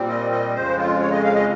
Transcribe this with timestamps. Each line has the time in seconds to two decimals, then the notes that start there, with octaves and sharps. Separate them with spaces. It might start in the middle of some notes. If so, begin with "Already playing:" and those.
Already playing: A#2 G3 C4
0.09 D#5
0.32 D#5
0.54 F2 C#3 G#3 C5
0.77 F4
1.00 C#5
1.12 D#5
1.23 F5
1.35 D#5